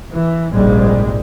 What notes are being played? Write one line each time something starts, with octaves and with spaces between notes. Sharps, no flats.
E3
F1 A#1 G#2 G3 G#3